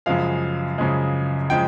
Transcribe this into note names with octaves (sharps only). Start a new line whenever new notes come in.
F#2 C#3 F3 G#3 F5
F#2 C#3 F3 G#3
C#3 F3 G#3 G5